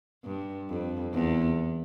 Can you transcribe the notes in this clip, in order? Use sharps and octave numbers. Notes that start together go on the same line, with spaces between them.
G2
F2
E2